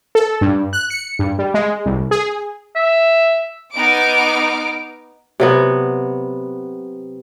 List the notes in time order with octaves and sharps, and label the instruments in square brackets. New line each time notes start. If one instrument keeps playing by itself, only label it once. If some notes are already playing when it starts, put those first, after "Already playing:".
[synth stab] A4
G2
F#6
C#7
G2
G3
G#3
C2
G#4
[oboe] E5
[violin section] B3 D#4 D6 F6 D7
[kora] C3 F#3 B3